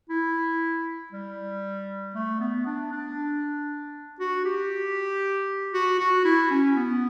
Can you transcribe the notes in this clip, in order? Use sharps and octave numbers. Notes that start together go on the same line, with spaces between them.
E4
G3
A3
B3
D4
D4
F#4
G4
F#4
F#4
E4
C#4
B3